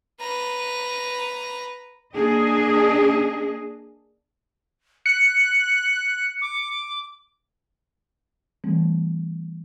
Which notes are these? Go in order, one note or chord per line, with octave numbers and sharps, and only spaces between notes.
B4 A#5
A#3 D4 G#4 D#5
F#6 C#7
D6
E3 G3 A3 C4